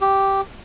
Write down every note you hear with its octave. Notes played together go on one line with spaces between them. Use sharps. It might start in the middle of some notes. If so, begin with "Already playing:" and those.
G4